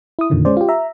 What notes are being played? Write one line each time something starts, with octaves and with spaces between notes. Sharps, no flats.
E4 D#6
F2 A#2 D3 D#3 F3
G#3 C#4 C5 D5
F4 G4
E5 A#5